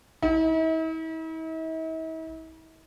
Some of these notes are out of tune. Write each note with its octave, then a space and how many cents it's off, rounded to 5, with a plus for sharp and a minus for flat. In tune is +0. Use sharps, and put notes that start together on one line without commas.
E4 -45